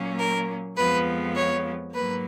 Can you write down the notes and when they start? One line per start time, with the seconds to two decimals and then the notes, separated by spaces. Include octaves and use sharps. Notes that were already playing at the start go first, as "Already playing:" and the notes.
Already playing: A#2 F#3 A#3 C#4
0.19 A#4
0.77 F2 F3 G#3 B3 B4
1.35 C#5
1.93 G#2 F#3 A#3 B4